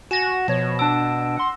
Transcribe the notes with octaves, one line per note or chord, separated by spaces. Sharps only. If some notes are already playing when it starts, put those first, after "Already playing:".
F#4 G#5 A#6 E7
B2 F3 C#5
D4 A5 E6 D7
F#5 C6